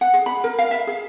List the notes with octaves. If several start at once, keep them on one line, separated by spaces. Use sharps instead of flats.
F#5
G#4
B5
A#4
F5
E5
G#4